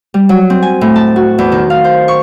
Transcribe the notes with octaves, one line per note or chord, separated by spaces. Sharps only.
G3
F#3
C4
G#5
A2
A5
F#4
E2
D#3
F5
C5
C#6